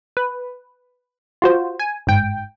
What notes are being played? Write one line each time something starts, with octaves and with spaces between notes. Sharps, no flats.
B4
F4 F#4 C5
G#5
G1 G#2 G5